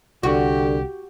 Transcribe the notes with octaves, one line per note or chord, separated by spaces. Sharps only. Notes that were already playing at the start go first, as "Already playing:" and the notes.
C2 D3 F#4 G4